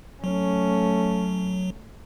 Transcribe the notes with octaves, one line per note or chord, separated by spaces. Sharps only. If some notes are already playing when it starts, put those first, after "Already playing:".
F#3 A3 C#4